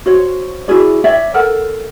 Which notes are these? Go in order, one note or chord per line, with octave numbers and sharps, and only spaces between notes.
F#4 C5 C#5
E4 F#4 G#4 D5
C#5 D5 E5 G5
A4 A#4 F#5